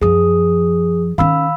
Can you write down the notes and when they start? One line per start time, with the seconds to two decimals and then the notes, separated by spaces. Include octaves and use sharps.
0.01 F#2 F3 G#4 D#6
1.18 D#3 C#4 F5 B5 E6